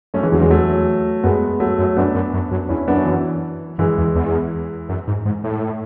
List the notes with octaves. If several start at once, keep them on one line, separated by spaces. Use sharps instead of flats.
F#2 A3 C#4
E3 G#3
E2 D3 F#3
E3 G#3
F#3 A3
F#2 G#3 B3
F#3 A3
F#2
F#2 B3 D4
F#2
F#2
F#2
E2 C#4 E4
F#2 B3 D4
E3
F#2 E3 G#3
E2
E2
F#2
G#2
G#2
A2